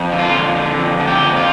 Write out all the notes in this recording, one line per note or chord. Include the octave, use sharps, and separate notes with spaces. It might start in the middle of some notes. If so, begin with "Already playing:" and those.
Already playing: F2
D3
F4
F2
D3
F2
D3
G4
F2
F4